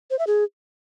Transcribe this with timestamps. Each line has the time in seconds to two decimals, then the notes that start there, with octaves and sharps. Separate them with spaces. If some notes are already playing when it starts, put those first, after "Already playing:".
0.11 C5
0.19 E5
0.27 G#4